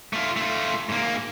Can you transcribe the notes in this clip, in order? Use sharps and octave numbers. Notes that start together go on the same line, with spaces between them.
A3 F4
A3 F4
G#2 A#3